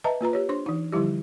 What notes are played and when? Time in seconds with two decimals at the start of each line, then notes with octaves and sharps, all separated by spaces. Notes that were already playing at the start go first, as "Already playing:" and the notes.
0.04 B4 D#5 E5 A5 A#5
0.21 A#3 F4 B4 A#5
0.33 G4 C#5
0.49 D4 C5 C6
0.66 E3 D#4
0.92 D3 F3 G3 E4 G4